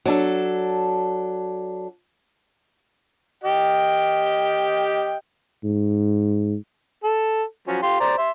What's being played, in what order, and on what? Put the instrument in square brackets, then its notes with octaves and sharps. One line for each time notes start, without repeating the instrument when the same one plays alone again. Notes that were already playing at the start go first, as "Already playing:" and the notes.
[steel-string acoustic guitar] F#3 D4 A4
[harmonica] G4 D#5 G5
[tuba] G#2
[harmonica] A4
F3 F#3 C#4
F4 G4 C6
C5 D5 A#5
E5 C6